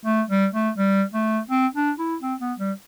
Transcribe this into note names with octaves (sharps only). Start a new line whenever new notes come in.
A3
G3
A3
G3
A3
C4
D4
E4
C4
B3
G3